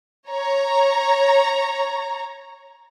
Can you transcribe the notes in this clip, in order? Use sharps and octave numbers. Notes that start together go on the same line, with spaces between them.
C#5 A#5